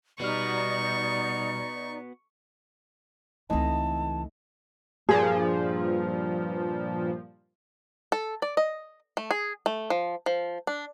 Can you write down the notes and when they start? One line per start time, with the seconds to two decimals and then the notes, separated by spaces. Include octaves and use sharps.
0.20 B2 G3 B3 D#4 F#4 D5 C#6 F6
3.50 C#2 C#3 E3 A3 C4 D#4 D#5 A5
5.09 G2 A#2 F3 G#4
8.12 A4
8.42 D5
8.57 D#5
9.17 A3
9.31 G#4
9.66 A3
9.90 F3
10.26 F3
10.67 D4